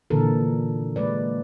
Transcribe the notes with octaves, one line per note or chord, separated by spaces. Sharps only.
A#2 D3 E3 A4 A#4
G#3 A#3 B4 D5